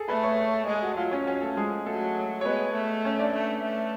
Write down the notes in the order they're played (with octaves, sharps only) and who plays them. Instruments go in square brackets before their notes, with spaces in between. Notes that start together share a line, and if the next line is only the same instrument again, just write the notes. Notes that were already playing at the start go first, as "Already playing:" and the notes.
Already playing: [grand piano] G#4 A4 G#5 A5
[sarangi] A3 [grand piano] B4 B5
[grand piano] C#5 C#6
C#5 C#6
A4 A5
[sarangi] G#3 [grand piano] G#4 G#5
[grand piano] F#4 F#5
[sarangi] F#3 [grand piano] F4 F5
[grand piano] C#4 C#5
[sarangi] F#3 [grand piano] C#4 C#5
[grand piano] A3 A4
[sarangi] F3 [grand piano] G#3 G#4
[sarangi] F#3 [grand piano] A3 A4
[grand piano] C#5
[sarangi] G#3 [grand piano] B3 B4
[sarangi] A3
[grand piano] C#4 C#5
D4 D5
[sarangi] A3
A3